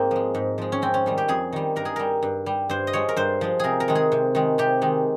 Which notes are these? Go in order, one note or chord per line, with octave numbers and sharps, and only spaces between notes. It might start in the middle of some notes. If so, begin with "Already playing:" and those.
Already playing: G#2 A#3 C4 D#4
F3 G#3
G#2
F3 G#3
C#4
F2 C4
C#4
D#3 G3
G4
F2 G#4
D#3 G3
G2 A#4
G#4
G3 A#4
G2
G3
G2 C5
D#5
F3 G#3 C#5
A#4
G2 C5
F3 G#3
C3 G#4 A#4
A#4
D#3 G#3
G#4
C3
D#3 G#3
C3 G4
D#3 G#3